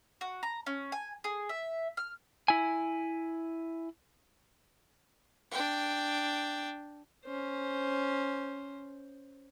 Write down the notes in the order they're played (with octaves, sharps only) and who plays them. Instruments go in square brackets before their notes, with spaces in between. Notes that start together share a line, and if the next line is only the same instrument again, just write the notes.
[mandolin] F#4
A#5
C#4
G#5
G#4
E5
F6
[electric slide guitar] E4 G#5
[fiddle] D4 G5
[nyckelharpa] C#4 C5